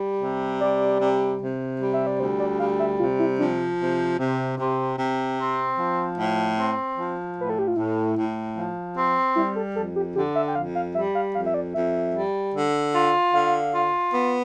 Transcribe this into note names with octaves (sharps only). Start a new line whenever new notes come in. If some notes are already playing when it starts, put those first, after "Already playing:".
Already playing: G3
C3
G3 D5
C3
C3
G3
E5
D5
D2 C5
D5
G3 F5
E5
C3 F4
E4
F3 D4
C3
C3
C3
C3
C4
F3
A2
C4
F3
A2 B4
A4
G4
F4
A2 E4
A2
F3
C4
G3 E4
A4
F2 A4
G4
D3 G4
E5
G5
F2 F5
F5
G3 E5
F5
F2 F5
E5
D5
F2 E5
G3
D3
F4
D3 F5
F4
B3